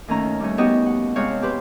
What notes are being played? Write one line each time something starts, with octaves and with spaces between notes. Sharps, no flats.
D#2 D#3 A3 C#4 A#5
G3 A3 C#4
B3 D#4 F#4 G4 D#5
F#5
C3 G#3 C4 C#5 F5 F#6
G4 B4 C5